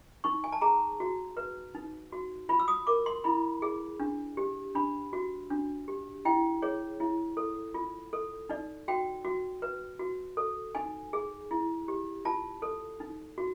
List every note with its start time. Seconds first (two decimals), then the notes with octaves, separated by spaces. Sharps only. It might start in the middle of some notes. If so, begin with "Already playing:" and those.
0.24 D#4 C#6
0.44 G#5
0.52 A5
0.61 G#4 A#5
1.00 F#4
1.37 B4
1.75 D#4
2.12 F#4
2.49 F4 B5
2.60 E6
2.68 D#6
2.87 A#4 D6
3.06 C6
3.24 E4 B5
3.62 G#4
4.00 D4
4.37 G4
4.75 D4 B5
5.13 F#4
5.50 D4
5.88 G4
6.25 E4 G5
6.62 G#4 C#5
7.00 E4
7.37 A4
7.74 F4
8.13 A4
8.49 D#4 D5
8.88 F#4 G5
9.24 F#4
9.62 B4
10.00 F#4
10.37 A4
10.75 D#4 G#5
11.13 G#4
11.51 E4
11.88 G4
12.25 F4 A5
12.62 A4
13.00 D#4
13.38 F#4